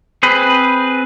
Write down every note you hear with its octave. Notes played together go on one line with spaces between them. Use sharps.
C4 G#4 B4